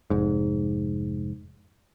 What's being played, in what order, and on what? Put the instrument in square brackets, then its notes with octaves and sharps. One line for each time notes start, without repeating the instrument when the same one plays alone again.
[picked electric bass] F1 G#2